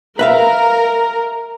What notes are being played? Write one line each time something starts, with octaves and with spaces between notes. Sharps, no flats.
A#4 B4 E5 F5